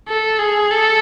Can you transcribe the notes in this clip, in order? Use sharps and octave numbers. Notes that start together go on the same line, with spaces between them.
A4
G#4
A4